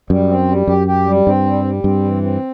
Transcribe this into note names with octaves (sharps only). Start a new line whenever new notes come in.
F#2 G3
C4
G3
F#2 G4
G4
G3
G2 C4
G3
G3
G2 C4
E3
C4